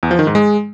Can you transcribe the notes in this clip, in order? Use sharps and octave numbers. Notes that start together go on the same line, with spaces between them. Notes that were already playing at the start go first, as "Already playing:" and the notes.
E2
F3
D#3
G#2
G#3